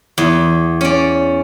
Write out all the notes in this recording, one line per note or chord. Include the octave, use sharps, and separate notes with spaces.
E2
C#4 D5